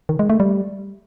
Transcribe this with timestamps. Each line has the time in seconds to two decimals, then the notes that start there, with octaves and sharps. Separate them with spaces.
0.09 D#3
0.19 G#3
0.30 A3
0.40 G3